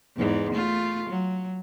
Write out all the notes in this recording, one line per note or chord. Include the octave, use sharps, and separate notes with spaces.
E2 G#2 E3
A3 F4
F#3